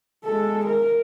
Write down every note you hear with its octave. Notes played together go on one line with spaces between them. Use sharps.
G#3 A4
A#4